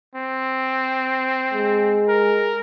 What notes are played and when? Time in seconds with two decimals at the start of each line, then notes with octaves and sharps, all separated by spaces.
0.15 C4
1.54 G#3
2.09 A#4